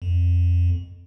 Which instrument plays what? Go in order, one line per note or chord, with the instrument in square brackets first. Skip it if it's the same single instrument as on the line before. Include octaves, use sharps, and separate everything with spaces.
[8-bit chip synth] F2